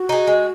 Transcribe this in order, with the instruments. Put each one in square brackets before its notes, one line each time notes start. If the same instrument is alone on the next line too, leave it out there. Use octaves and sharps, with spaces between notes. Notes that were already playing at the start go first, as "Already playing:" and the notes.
Already playing: [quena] F#4
[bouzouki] D#4 G#4
G#3